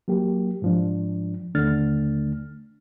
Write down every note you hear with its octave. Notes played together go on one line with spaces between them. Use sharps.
F#3 A#3 G4
G#2 F3 D4
D#2 D3 A3 D4 F6 A6